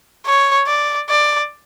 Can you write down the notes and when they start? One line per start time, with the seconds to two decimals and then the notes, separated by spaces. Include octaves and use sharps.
0.26 C#5
0.67 D5
1.09 D5